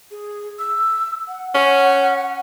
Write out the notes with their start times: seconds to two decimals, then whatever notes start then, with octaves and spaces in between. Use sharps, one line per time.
0.11 G#4
0.59 E6
1.27 F#5
1.54 C#4 F#5